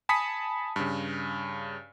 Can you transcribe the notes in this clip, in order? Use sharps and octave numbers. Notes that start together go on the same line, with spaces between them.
G#5 A5 B5 D#6 B6 C#7
G2 C#3